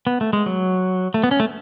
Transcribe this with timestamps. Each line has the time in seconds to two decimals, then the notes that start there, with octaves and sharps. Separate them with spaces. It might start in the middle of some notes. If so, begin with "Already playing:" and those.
0.07 B3
0.21 A3
0.33 G#3
0.46 F#3
1.14 A3
1.24 B3
1.31 C#4
1.40 A3